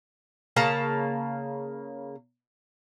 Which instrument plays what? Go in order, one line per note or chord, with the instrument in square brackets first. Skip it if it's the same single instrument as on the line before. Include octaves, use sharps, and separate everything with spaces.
[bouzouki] C#3 A#3 A5 A#5